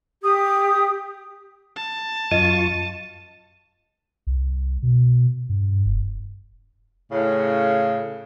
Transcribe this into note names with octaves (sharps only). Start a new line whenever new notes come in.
G4 D#6
A5
F#2 F4 D#5 C#6 D#7
C2
B2
G2
F1
A2 C#3